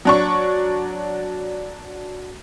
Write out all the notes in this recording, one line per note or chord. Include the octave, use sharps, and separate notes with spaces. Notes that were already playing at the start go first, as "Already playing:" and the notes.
F#3 D4 C#6